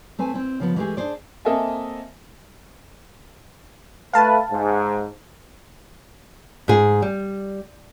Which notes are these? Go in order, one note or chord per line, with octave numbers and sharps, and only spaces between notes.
A3 C4 B4 G#5
C4 E4
C#3 F3 B3
E3 G#3 A3 D#4 G4 G#4
D4 G#4 C5 D5
A#3 C4 A4 D#5 E5 G#5
A3 B4 F5 A5
G#2
G#2 G#4
G3